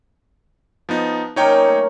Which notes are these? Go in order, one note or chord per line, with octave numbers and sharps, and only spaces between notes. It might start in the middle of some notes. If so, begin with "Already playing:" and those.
F3 B3 D#4
F#3 A#3 C#4 D#4 C#5 G5
A3